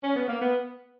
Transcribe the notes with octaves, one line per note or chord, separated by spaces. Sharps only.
C#4
B3
A#3
B3